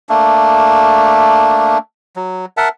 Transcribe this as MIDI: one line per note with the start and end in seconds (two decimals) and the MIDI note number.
0.09 1.78 57
0.09 1.78 58
0.09 1.78 62
2.16 2.46 54
2.57 2.69 70
2.57 2.69 76
2.57 2.69 78
2.57 2.69 81